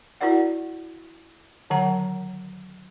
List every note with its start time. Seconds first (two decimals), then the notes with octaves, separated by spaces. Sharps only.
0.21 E4 F#4 A#4 D5 F#5
1.70 D3 D#3 F#3 C#5 F#5 A#5